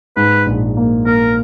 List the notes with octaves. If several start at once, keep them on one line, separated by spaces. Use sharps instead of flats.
G#2 B4
A#1
A#3
A#3 A#4